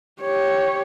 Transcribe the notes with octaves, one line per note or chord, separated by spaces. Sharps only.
G4 C#5